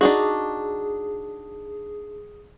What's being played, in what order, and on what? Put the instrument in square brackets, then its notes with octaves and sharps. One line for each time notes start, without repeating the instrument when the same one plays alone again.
[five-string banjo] D4 D#4 F#4 [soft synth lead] G#4